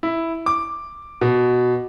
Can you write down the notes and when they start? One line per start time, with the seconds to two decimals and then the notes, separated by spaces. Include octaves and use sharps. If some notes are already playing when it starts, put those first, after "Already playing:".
0.03 E4
0.46 D6
1.21 B2